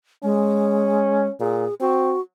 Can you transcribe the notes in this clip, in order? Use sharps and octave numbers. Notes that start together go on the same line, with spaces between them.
G#3 C#4
A#2 G#4
C4 F#4